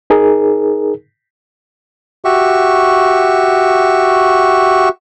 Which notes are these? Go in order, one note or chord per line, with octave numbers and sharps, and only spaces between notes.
D#4 G#4 A#4
F#4 G4 E5 C#6